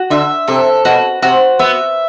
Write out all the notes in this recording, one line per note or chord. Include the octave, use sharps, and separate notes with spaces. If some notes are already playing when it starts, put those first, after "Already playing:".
Already playing: F#4
D3 E5
C3 A4
B2 F#4
C3 F#4
B3 E5